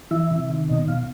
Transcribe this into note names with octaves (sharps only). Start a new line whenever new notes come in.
E3 E5
C3
D#3
B2 D#5
B2 F5